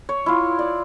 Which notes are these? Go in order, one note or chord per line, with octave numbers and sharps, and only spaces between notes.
C#5
E4 F4
D5